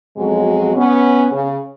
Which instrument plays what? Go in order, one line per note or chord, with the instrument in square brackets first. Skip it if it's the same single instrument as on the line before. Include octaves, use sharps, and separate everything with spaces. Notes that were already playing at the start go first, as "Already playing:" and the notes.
[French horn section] F2 B2 F#3 G#3
B3 C#4
C#3